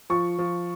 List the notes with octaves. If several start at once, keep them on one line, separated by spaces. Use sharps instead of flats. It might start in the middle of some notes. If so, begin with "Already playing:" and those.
F3 C#6
F3